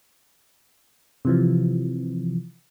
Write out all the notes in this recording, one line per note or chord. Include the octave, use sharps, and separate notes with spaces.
C3 E3 F3